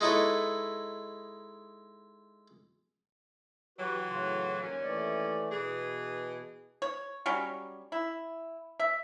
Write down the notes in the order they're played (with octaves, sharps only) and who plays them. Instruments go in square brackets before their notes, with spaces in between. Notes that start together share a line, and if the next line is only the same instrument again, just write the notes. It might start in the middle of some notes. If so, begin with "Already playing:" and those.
[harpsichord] G#3 D#4 E4 A4 B4 C#5
[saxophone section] E3 F#3 [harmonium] F#4 G4 B4
[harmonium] A2 C#3 F4
[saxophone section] D#2 C#4
[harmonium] E3 A3 D5
[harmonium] B2 [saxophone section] E3 G#4
[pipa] C#5
F#3 G3 C#4
E4
E5